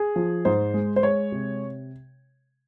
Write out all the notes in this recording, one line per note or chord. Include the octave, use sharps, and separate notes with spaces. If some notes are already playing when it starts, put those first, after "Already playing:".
Already playing: G#4
F3
G#2 C5
G#3
C5
G#3 C#5
C3